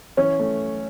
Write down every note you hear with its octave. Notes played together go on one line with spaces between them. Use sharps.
E3 C#4
A3